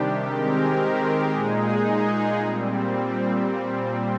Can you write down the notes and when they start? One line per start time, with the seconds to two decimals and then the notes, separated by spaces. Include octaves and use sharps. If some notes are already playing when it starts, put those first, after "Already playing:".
Already playing: C3 D#3 G3 D4 G4
0.27 D#3 G#3 C4 G4 A#4
1.33 A#2 G#3 D#4 G#4
2.40 A#2 G3 C4